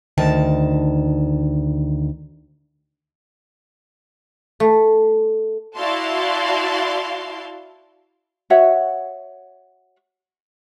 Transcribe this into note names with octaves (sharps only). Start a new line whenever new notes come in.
D2 D#3 A5
A3
E4 F#4 D5 F5 A5 C6
F#4 C#5 E5 F#5